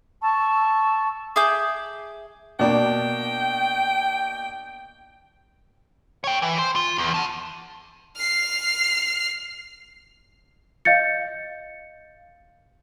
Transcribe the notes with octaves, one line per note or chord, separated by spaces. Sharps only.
A5 C#6 E6
G#4 E5 D6 G6
B2 A#3 D4 G5
C#5 G5
E3
C5
F4
E2
F#5 A5
F6 C7
D#5 F5 G6 A6 C#7